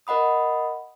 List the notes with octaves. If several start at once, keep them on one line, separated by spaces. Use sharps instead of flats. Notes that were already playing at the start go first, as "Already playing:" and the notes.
A#4 D#5 F#5 B5 D#6